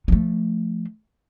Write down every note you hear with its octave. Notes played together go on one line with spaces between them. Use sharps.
F3 A3